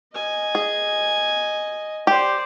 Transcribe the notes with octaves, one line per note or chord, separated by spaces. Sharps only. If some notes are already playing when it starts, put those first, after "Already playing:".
D#5 G#5
G#4
G4 C5 D5